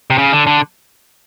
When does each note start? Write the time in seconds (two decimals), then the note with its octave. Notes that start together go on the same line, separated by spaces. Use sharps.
0.10 C3
0.18 C#3
0.33 D3
0.47 D3